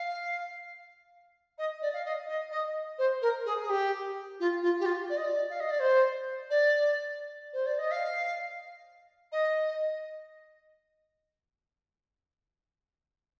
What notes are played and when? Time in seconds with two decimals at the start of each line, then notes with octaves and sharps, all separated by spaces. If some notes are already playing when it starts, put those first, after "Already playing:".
Already playing: F5
1.58 D#5
1.82 D5
1.93 F5
2.05 D#5
2.28 D#5
2.51 D#5
2.98 C5
3.22 A#4
3.45 G#4
3.62 G#4
3.69 G4
4.40 F4
4.62 F4
4.79 G4
4.85 F4
5.09 D5
5.17 D#5
5.24 D5
5.49 F5
5.60 D#5
5.70 D5
5.79 C5
6.50 D5
7.53 C5
7.66 D5
7.78 D#5
7.91 F5
9.32 D#5